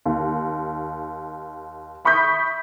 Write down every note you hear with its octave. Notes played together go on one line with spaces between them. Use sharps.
D#2
E5 B5 C#6 D#6 G6 B6